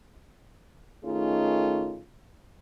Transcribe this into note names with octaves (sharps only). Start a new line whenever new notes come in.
D#3 A3 C#4 D#4 F4 G#4